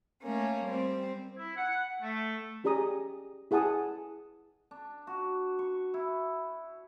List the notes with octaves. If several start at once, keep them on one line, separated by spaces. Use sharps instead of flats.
A3 A#3 C#4
G3 C4
E4
F#5
A3
C#4 G4 G#4 D5 A#5 D#6
E4 G#4 F#5 A5 D#6
D4
F#4
C#6
E4